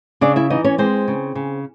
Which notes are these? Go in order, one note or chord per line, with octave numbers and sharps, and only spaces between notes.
C#3 D4 D5
E4 E5
E3 D#4 D#5
C#4 C#5
G#3 C4 C5
C#3
C#3